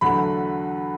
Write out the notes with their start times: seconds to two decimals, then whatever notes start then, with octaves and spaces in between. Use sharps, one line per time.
0.01 E2 D3 F#3 A3 B5